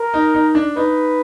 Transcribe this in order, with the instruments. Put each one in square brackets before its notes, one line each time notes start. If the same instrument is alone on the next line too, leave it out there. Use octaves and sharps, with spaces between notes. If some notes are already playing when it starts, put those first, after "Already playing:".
Already playing: [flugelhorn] A#4
[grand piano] D#4
D#4
D4
[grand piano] D#4 [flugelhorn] B4